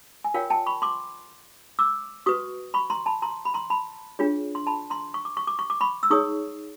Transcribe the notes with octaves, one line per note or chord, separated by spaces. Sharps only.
G#5
F4 A#4 C#5 F5 G5
G5 A5
B5 C#6
C6 D6
D6 E6
F#4 B4 C#6 D#6
B5 C#6
A#5 C6
A5 B5
A#5 C6
B5
A#5 C6
A5 B5
D4 F4 G#4 C#5
C6
A5 B5
A#5 C6
C#6
D6
C#6
D6
C#6
D6
B5 C#6
E6
D#4 G#4 C#5 C#6 D#6